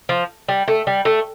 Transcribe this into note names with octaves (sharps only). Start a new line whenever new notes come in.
F3
G3
A3
G3
A3